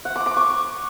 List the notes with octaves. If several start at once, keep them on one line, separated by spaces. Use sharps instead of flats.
F#5
D6
D6
C#6